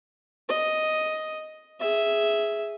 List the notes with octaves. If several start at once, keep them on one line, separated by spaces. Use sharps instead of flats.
D#5
G#4 E5